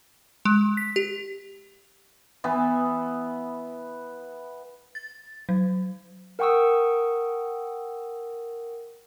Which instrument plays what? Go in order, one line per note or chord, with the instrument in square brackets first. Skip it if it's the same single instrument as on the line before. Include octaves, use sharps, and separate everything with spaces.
[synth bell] G#3
B6
G4
[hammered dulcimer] E3 B3
[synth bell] A6
F#3
[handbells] A#4 F#5 G5 C#6 D#6 E6